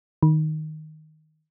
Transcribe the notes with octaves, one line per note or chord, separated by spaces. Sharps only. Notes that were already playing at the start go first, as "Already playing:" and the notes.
D#3